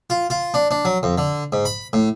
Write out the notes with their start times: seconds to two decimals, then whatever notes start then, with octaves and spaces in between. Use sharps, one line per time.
0.10 F4
0.30 F4
0.54 D4
0.71 D4
0.85 F#3
1.03 F2
1.18 D3
1.52 G#2
1.65 B5
1.93 A2